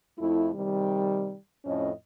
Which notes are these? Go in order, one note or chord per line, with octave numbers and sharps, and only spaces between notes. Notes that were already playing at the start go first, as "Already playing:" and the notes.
F2 A3 E4
C3 D#3 G3
F2 A2 C#4 D#5